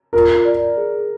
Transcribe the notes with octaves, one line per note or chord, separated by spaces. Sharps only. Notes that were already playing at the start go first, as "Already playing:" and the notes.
F4 A#4
D5
G#4